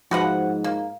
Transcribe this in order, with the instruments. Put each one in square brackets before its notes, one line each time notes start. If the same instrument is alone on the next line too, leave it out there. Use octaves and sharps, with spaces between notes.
[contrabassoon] G#2 [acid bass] F3 [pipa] F#4 B4 F#5
[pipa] A#3